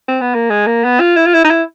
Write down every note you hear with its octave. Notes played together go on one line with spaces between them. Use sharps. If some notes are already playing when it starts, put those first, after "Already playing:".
C4
B3
A#3
G#3
A#3
B3
F4
E4
F4
E4
D#4
E4